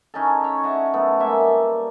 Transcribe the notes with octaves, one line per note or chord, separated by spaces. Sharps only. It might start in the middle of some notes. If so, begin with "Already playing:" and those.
C#4 D#4 G#4 A4
C#5
D#5 E5 F#5 A5
F#3 A3 B3
G#3 A#3 A4 E5
G3